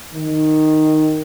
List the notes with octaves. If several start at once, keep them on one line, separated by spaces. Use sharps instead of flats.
D#3